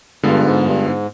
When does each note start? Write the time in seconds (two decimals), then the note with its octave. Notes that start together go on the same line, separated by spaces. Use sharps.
0.23 G2 D3 G#3 B3 F4
0.45 G#2
0.65 G2
0.85 G#2